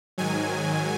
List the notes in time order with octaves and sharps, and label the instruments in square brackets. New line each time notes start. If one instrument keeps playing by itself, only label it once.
[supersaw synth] G#2 D#3 F#3 G#5